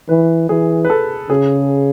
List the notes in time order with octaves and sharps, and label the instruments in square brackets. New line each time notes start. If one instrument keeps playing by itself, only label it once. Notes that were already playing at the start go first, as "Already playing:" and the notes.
[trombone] E3 [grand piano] B4
[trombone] E3 [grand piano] G#4
[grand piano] B4
A4
[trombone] C#3 [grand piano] G#4